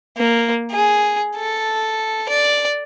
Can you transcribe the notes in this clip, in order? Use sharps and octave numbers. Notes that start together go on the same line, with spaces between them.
A#3
G#4
A4
D5